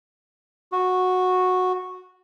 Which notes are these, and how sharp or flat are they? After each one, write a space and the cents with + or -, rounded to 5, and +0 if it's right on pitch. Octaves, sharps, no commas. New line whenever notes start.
F#4 -10